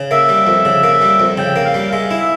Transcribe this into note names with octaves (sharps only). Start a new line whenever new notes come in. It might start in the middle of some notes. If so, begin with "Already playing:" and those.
Already playing: C#3
A#3 E5
G3
F2
C#3
A#3
G3
F2
C#3 G5
A#3
F5
G3
G#3 E5
E4
E5